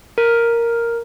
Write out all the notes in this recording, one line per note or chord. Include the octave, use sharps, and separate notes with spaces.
A#4